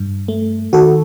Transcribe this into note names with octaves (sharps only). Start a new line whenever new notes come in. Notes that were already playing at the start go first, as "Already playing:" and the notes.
Already playing: G2
A3
D#3 F#4 A4